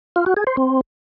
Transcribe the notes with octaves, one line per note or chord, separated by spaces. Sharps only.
F4
F#4
G#4
C5
C4